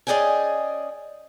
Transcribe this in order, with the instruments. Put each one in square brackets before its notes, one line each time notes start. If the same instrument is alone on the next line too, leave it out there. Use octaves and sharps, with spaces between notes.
[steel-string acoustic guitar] C#4 G#4 D5 D#5 G5 G#5